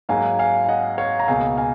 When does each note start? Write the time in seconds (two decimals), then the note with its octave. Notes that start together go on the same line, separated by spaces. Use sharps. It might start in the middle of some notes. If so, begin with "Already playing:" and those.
0.09 G#2 F#3 A#3 F5 G#5
0.39 F5 G#5
0.65 G#5
0.68 D#5 F#5
0.98 C#5 F5
1.20 A#5
1.28 C#2 B2 A#3 F5 G#5
1.57 F5 G#5